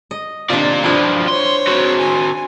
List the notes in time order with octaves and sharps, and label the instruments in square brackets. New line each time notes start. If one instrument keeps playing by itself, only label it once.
[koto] D#5
[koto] C3 D#3 D4 [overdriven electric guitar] F4 D5
[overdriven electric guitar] G2 F3 [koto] D4 E4
[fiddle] C5 C#5 [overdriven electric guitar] C6
[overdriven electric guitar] C4 F#4
[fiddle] G#5